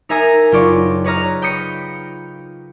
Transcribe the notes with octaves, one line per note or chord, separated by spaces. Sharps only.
D#4 A#4 E5 G#5 A#5 D#6
F#1 F4 D5 C#6
B4 C#5 D#5 A#5 F6
G5 B5 D#6 C#7